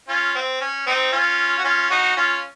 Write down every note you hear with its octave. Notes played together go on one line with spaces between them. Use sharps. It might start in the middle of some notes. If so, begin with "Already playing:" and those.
C#4 F4
C4
C#4
C4 D#4
C#4 F4
F#4
C#4 F4
D#4 F#4
C#4 F4